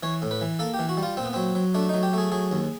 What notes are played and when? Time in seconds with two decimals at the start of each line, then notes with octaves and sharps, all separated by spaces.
0.03 E3 C#5
0.22 A2
0.31 B4
0.41 E3
0.59 A#3 A4
0.74 G4
0.79 E3
0.89 F#4
0.97 G3
1.03 F4
1.17 A#2 C4
1.25 B3
1.33 F#3 C4
1.55 F#3
1.74 A3 D4
1.89 F#3 D#4
2.03 G4
2.13 A3 G#4
2.32 F#3 G#4
2.51 D#2